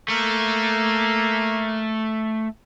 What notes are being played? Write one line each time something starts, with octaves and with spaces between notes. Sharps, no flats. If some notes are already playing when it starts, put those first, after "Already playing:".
A3 A#3